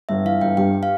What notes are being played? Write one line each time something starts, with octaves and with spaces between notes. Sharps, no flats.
G1 E5
E3 F5
G1 G5
G2 G5
F5